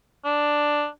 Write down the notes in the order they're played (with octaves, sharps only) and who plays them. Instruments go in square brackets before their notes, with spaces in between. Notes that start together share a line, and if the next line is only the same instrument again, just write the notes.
[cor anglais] D4